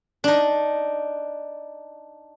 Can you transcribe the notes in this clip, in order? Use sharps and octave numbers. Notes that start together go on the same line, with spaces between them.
D4 D#4